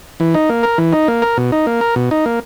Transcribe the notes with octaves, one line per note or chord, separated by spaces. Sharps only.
E3
D#4
A#3
A#4
E3
D#4
A#3
A#4
B2
D#4
A#3
A#4
B2
D#4
A#3